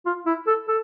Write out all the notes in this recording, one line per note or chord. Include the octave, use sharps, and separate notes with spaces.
F4
E4
A4
A4